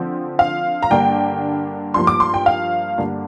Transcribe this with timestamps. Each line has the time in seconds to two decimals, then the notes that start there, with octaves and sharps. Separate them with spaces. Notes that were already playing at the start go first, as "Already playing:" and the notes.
Already playing: D3 F3 C4
0.39 F5
0.82 A#5
0.91 G2 D3 A#3 D4 G5
1.94 G2 F3 A#3 C6
2.07 D6
2.20 C6
2.34 G5
2.46 F5
2.98 G2 D3 A#3 D4